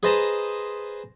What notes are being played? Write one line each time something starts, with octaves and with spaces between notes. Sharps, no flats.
G#4 B4 C5 D#5 A5 A#5